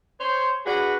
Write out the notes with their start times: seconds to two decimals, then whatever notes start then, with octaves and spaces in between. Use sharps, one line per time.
0.19 C5 C#5
0.65 D4 F#4 G#4 B4